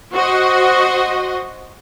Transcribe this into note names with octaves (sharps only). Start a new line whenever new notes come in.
F#4 C5 D#5